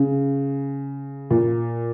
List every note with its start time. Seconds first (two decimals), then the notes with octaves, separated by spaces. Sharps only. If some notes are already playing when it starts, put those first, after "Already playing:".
Already playing: C#3
1.31 A#2